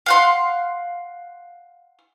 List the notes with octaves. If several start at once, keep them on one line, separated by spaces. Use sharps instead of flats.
F5 F#5 C6